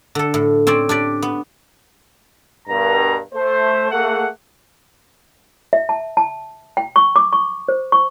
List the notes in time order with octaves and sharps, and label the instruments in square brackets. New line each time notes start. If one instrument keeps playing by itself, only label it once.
[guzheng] D3 A4
A2
C4 C#4 C5 D5
D4 G4 D5
B3
[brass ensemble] G2 B2 A#4 A#5
A3 C5
A3 A#3 G#4 F#5
[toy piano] E5
A5
A5
G5
C#6
D6
C#6
C5
C#6